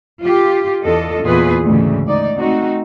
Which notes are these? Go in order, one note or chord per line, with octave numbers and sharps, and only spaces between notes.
F4 G4
E2 D4 F4 A4 D#5
E2 A#2 F4 G#4 B4
D2 G#2 C#3 E3
G#2 D#4 D5
A3 C4 D#4 F#4